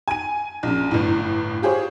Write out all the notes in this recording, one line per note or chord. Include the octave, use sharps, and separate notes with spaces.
G#5 D#7
A#1 F#2
G1 A2
F4 G4 G#4 C5 C#5